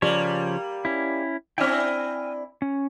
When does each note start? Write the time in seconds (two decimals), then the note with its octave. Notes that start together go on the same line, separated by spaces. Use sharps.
0.02 C#3 F3 G3 A#3 C#5
0.85 C#4 E4
1.58 C4 D4 E4 G5 G#5 F6
2.62 C#4